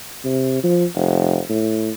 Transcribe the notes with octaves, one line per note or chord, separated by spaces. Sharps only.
C3
F3
F1
A2